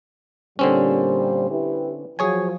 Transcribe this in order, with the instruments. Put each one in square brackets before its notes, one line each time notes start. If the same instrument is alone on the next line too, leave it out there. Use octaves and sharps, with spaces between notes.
[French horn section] A#2 G3 C5 [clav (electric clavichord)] D3 C4 C#4
[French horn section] E4 G4 B4
[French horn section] F3 F#3 [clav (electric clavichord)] G#4 C#5 G#5